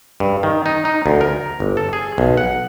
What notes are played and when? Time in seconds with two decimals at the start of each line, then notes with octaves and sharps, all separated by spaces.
0.20 G2
0.43 D#3
0.66 D#4
0.85 D#4
1.06 D2
1.21 A#4
1.60 G1
1.77 A4
1.93 G#4
2.18 B1
2.37 F#5